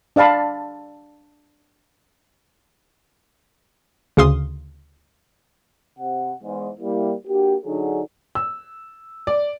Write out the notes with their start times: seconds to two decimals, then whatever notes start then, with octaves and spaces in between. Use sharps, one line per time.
0.16 D4 D5 F5 A5 B5
4.17 D2 C#3 F5 C6 D#6
5.99 C3 F#5
6.44 E2 G#2
6.81 G3 A#3 E4
7.27 A#3 D4 F#4 G4
7.66 D3 F#3 D4 D#4 G#4
8.35 E6
9.27 D5